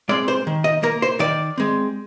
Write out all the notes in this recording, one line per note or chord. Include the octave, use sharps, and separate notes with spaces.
G#3 C4 D5
C5
D#3
D#5
A#3 A#4
C5
D#3 D5
G#3 C4